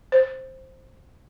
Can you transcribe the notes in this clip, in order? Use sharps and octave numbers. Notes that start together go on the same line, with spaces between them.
C5